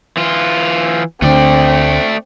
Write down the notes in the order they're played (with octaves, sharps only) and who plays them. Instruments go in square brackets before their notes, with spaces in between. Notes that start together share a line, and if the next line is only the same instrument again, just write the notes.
[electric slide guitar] E3 F4
[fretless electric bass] D2 D3 [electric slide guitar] A3 D5 [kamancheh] C4